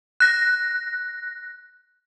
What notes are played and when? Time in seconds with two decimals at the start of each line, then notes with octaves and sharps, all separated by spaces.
0.20 F#6 A#6